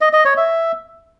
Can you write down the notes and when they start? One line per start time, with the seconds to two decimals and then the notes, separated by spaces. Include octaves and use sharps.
0.01 D#5
0.13 D#5
0.25 C#5
0.37 E5